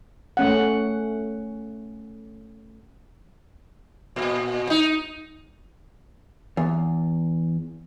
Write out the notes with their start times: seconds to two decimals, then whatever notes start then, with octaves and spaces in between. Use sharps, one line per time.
0.37 A3 C#4 F#5
4.16 A#2
4.70 D#4
6.57 E2